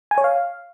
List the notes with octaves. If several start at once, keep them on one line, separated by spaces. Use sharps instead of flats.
G#5
C#5
F5